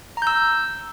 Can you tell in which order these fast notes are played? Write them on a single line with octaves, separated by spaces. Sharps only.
A#5 G6 E6